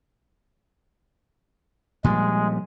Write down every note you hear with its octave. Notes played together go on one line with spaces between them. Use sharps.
A#2 F3 G3 G#3